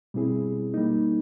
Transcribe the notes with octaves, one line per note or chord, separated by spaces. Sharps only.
B2 G3 C4 E4 G#4
G3 A#3 D#4